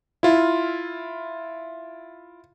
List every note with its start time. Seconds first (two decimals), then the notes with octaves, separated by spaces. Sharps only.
0.23 E4 F4